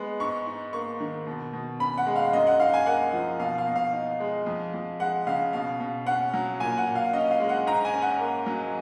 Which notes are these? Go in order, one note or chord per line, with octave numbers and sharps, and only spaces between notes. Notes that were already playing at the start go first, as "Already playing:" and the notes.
Already playing: G#3 B3
G#2 C#6
D#4
A#3 C#6
D#3
B2
B2
C#4 B5
F#5
G#3
F5
F#2 D#5
F#5
D#4 F5
G#5
A#3 F#5
F3
B2 F5
F5
B2
F5
D#4
G#3
F2
F2
G#3 F#5
C#3 F5
B2 F5
B2
C#4 F#5
F#3
A#2 G#5
F#5
A#2
F5
C#4 D#5
F5
G#3
F#5
G#2 A#5
G#5
C#4
F#5
A#3
F#3